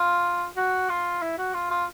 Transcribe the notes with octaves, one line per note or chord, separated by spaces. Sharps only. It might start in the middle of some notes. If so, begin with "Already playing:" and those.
Already playing: F4
F#4
F4
E4
F#4
F4
F4